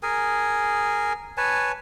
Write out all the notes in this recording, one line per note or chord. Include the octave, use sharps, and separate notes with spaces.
G#4 A#4 G#5
B4 C#5 G#5 A5